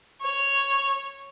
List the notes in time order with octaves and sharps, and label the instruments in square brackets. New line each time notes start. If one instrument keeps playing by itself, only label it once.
[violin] C#5